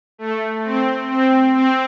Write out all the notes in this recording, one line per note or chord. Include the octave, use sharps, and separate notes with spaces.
A3
C4
C4
C4